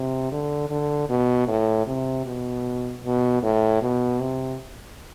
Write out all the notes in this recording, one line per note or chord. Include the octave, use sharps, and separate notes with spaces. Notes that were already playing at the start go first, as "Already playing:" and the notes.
Already playing: C3
D3
D3
B2
A2
C3
B2
B2
A2
B2
C3